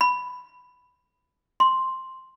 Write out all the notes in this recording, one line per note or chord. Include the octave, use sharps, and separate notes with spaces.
B5
C6